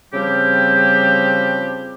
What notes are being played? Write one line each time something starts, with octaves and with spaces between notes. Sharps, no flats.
C#3 F3 G3 C4 G4